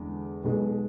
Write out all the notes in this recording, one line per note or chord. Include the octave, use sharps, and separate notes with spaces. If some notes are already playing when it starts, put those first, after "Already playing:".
Already playing: E2 D3 G#3 D4
B1 B2 G#3